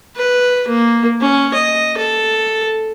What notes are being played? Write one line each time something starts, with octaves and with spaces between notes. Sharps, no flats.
B4
A#3
C#4
D#5
A4